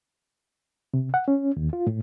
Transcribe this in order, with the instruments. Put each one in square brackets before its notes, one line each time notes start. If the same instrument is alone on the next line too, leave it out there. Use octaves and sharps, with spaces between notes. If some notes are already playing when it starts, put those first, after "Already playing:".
[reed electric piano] C3
F#5
C#4
D#2
F4
A2